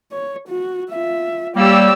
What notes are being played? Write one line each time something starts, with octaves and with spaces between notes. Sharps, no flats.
C#5
F#4
F4 E5
G3 A#3 G4 C#5 D5 E6